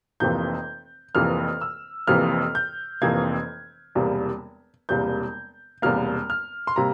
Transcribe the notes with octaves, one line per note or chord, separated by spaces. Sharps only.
F1 F2 C3 E3 A#3 G6
F1 F2 C3 E3 A#3 F6
E6
F1 F2 C3 E3 A#3 F6
G6
F1 F2 C3 E3 A#3 G#6
E1 E2 C3 G3 A#3
E1 E2 C3 G3 A#3 G6
E1 E2 C3 G3 A#3 F6
F6
C6
C3 G3 A#3 A#5